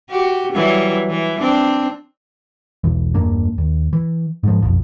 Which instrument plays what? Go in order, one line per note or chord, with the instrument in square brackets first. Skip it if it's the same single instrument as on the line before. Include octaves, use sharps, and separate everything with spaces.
[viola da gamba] F#4 G4
E3 F#3 G3
E3
C4 D4
[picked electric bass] E1 B1 E2 E3
E2 G2 A#3 D4
D#2
E3
G#2 F3
F#1 B1 F2